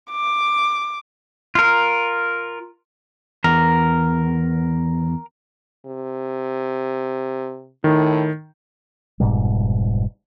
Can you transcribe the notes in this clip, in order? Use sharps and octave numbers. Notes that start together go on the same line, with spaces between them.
D6
F4 A#4
E2 A#4
C3
A2 D#3
F1 G#2 B2 G3